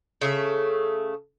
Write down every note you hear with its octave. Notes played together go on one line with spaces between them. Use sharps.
C#3 A3 E5